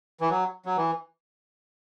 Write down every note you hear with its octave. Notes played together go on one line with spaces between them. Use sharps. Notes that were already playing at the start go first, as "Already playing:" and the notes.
E3
F#3
F#3
E3